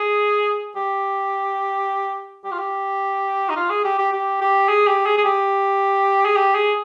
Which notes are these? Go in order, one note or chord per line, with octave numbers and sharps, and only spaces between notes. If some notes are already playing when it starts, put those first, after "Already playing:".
Already playing: G#4
G4
G4
F4
G4
D#4
F4
G#4
G4
G4
G4
G4
G#4
G4
G#4
G#4
G4
G#4
G4
G#4